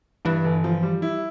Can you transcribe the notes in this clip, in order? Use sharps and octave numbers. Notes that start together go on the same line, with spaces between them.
G2 E3
G1
F3
G3
E4